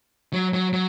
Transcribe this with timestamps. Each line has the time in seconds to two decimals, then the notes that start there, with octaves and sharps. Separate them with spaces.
0.33 F#3
0.53 F#3
0.73 F#3